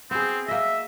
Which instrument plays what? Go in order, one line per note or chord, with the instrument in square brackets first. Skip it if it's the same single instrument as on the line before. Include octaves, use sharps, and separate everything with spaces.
[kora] B3 G#4 [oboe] C4
[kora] A#3 D#5 [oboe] E5